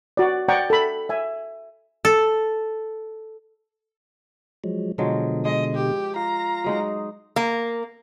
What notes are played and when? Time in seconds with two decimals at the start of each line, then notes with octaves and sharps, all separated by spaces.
0.17 F#4 D5
0.48 D5 F#5 G5 A#5 C#6
0.70 A4 B5
1.09 E5 G#5
2.05 A4
4.64 F3 F#3 G#3
4.98 B2 D3 F3 F#3 G#3
5.45 G#3 D#5
5.75 G4
6.16 F4 F5 A#5
6.64 F#3 G#3 D#4
7.36 A#3